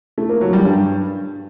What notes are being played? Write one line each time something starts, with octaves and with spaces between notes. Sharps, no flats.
A3
A#3
F#3
G3
G2